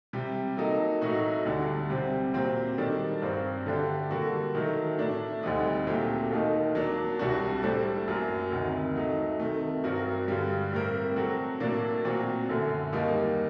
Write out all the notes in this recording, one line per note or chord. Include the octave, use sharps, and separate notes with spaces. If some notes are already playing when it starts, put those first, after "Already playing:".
C3 G3 C4 G4
F#3 A#3 D#4 A4
A2 F#3 A3 D#4 F#4
D2 D3 G3 D4
C3 G3 C4 G4 C5
A#2 F#3 C4 G4 C5
D#3 G3 D4 A4
G2 F#3 C4 F#4 C5
D3 A3 D4 G4
D3 G3 A#3 F#4 A4
D#3 F#3 A3
A2 A3 D4
D2 D3 G3 C4 D#4
A#2 F#3 A3 C4 G4
D#2 D#3 A3 D#4
F#3 A#3 D4
C2 C3 G3 D4 F#4
A2 G3 D4 A4 C5
F#2 F#3 A#3
D2 C3 D#3
F#3 A3 D#4
C3 D#3 A3
G2 F#3 C4 F#4 A#4
G2 D3 G3
A2 G3 C4 G4 A#4
F#3 C4 F#4 A4
A2 F#3 A#3 D4
A#2 F#3 C4 F#4
F#2 D3 A3
D#2 D#3 G3 A#3 D#4